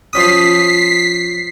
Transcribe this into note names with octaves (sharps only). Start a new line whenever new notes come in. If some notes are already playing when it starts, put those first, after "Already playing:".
F3 C#4 D#6 B6 C7